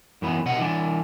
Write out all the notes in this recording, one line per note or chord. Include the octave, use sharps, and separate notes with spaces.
F#2 E3 B3
B1 C3 D#5 F#5
E3 D4